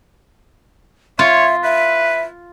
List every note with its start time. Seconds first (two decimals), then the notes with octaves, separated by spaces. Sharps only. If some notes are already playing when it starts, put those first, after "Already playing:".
1.19 F4 C#5 E5
1.64 B4 E5